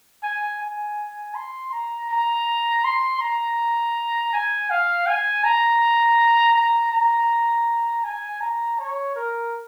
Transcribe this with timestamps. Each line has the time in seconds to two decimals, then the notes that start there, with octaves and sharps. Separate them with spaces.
0.23 G#5
0.61 G#5
1.35 C6
1.72 A#5
2.09 A#5
2.84 C6
3.21 A#5
4.33 G#5
4.70 F5
5.06 G#5
5.44 A#5
6.55 A#5
6.92 A#5
8.04 G#5
8.41 A#5
8.79 C#5
9.15 A#4